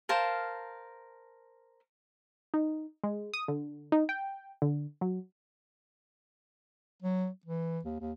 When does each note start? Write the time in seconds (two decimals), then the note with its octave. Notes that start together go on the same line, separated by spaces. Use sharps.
0.09 A#4 C5 F5 A5
2.54 D#4
3.04 G#3
3.34 D#6
3.48 D3
3.92 D#4
4.09 G5
4.62 D3
5.01 F#3
7.02 F#3
7.46 E3
7.85 D#2
8.00 D#2